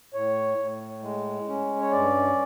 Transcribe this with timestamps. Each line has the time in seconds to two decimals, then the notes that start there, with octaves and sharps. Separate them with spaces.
0.14 A2 C#5
0.58 A2
1.03 G#3
1.48 C#4
1.81 C#5
1.92 G2 D5